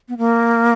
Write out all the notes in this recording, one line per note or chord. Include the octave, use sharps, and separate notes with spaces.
B3
A#3